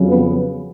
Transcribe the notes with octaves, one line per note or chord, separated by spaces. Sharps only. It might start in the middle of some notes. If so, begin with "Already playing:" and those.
Already playing: F2 C#3 F#3
B3